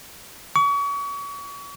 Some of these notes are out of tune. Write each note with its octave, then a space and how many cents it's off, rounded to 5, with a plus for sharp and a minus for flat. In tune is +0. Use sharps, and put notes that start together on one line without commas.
C#6 +35